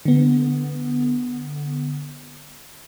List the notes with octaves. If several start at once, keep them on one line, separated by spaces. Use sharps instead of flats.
D3 B3